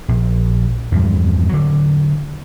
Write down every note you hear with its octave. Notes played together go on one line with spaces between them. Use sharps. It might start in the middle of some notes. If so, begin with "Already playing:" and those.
A#1
E2 G2 F3
D3 F#3